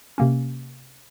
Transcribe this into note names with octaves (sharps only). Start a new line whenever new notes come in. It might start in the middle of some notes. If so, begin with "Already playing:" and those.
C3 A#3 C#4